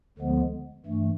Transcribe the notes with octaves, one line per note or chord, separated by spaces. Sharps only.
D2 D3 F3 G#3 B3
G2 E3 A3